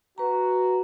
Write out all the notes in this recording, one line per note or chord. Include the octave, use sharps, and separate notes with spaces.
F#4 B4 A#5